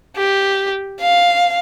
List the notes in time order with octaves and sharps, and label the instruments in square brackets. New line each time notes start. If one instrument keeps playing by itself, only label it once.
[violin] G4
F5